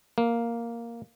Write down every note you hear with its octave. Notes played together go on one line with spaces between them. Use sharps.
A#3